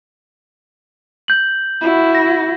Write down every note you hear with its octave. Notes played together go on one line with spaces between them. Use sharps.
G6 F#7
E4 F#4
A#6